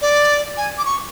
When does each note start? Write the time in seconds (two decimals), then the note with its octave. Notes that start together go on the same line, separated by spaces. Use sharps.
0.02 D5
0.57 G#5
0.78 D6
0.86 C#6